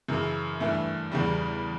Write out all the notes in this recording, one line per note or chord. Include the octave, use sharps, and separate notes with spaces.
F#2 C#3 E3
G2 E3 A3
E2 C#3 G3